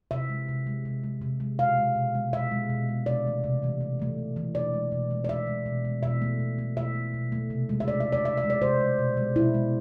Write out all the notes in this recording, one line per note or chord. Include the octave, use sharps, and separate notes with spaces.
C3 E5
G#3
C3
G#3
C3
G#3
C3
G#3
B2 F5
G#3
B2
G#3
B2 E5
G#3
B2
G#3
C3 D5
E3 A3
C3
E3 A3
C3
E3 A3
C3
E3 A3
B2 D5
G#3
B2
G#3
D5
B2 E5
G#3
B2
G#3
B2 E5
A3
B2
A3
B2 E5
A3
B2
A3
C3
G#3
E5
C3 D5
E5
G#3
D5
C3 E5
E5
G#3
D5
C3 C5
G#3
B2
G#3
B2 E4
G#3